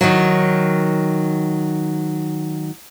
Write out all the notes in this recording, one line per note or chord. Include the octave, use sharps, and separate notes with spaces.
D#3 F#3